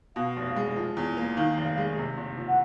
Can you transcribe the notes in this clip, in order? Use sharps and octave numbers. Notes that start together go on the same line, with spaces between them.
B2 F5
F1
G#3
F3
E2
A#3
D#3 F5
F1
G#3
C3
F#1
F3
F#5